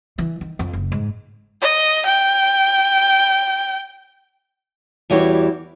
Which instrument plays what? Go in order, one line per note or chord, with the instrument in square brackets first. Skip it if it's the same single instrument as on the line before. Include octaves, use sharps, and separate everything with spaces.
[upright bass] E3
D#3
F2
F#1
G#2
[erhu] D#5
G5
[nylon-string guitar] E2 E3 G3 F#4 G4 C#5